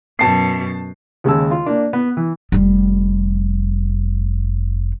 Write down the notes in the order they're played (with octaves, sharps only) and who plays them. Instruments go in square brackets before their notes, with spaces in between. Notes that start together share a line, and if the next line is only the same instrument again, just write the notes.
[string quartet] F#2 B2 [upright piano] A5 C7
[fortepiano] D#2 C#3 G#3 A5 E6
F4
A#3 D4
B3
E3
[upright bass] F1 G3